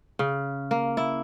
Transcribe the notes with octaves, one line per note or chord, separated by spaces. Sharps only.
C#3
A#3
E4